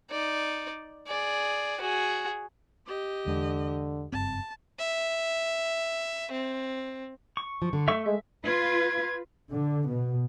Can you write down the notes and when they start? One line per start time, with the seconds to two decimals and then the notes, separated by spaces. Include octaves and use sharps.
0.11 D#4 D5
1.07 G#4 D5
1.81 F#4 G#4
2.86 G4 D#5
3.26 E2 D3 G#3
4.12 F#1 G2 C4 A5
4.79 E5
6.31 C4
7.37 C#6
7.62 F3
7.73 D3
7.88 A3 E5 C#6
8.06 G#3 E5
8.46 F4 B4 G#6
9.51 D3
9.88 B2